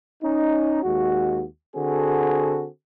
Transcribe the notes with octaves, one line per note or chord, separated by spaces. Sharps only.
C#4 D#4
D#2 G#3 F#4
D3 C4 F#4 G#4 A4